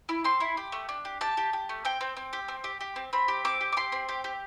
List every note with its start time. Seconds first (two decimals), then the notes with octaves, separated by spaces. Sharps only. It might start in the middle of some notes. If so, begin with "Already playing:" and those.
0.09 E4
0.24 C4 C6
0.40 E4
0.57 G4
0.72 A3
0.89 D4
1.05 G4
1.21 G4 A5
1.37 G4
1.53 G4
1.69 A3
1.85 C4 G5
2.01 C4
2.16 C4
2.33 G4
2.48 C4
2.64 G4
2.81 G4
2.96 C4
3.13 C4 B5
3.28 G4
3.45 C4 D6
3.61 G4
3.72 D6
3.77 G4 C6
3.92 C4
4.09 G4
4.24 G4